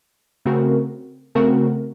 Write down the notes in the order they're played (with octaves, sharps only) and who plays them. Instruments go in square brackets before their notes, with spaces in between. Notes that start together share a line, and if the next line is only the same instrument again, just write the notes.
[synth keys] C#3 A3 C4 F#4 A#4
C#3 A3 C4 F#4 A#4